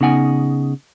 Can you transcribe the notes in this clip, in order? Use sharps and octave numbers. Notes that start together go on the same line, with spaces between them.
C#3 B3 D#4 F#5 G#5